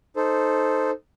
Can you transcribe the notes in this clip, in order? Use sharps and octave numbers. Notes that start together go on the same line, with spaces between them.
D#4 A4 C5